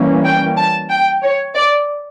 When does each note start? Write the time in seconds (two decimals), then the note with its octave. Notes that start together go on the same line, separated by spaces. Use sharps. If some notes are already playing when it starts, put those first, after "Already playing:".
Already playing: E3 G3 A#3 C#4
0.24 G5
0.57 A5
0.90 G5
1.22 C#5
1.55 D5